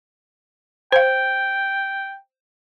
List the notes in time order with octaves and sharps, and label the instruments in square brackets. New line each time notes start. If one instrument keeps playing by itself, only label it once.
[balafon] C5 F5 [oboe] G5